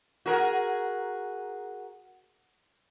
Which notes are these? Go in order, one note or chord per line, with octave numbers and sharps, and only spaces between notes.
F#4 G#4 A#4